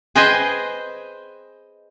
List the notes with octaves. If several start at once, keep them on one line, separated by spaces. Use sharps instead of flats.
G#4 B4 C5 D#5 G5 G#5